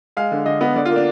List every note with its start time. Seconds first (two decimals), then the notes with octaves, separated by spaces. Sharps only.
0.17 G#3 F5
0.32 D3
0.46 D3 D#5
0.61 B3 D#5
0.76 D3 D5
0.85 F4
0.90 A#3
0.96 D4